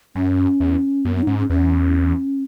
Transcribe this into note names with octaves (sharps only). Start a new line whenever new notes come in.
F#2 C#4
E2
F#2 B3
B3
D#4
G#2 C#4
C#4
E2 C#4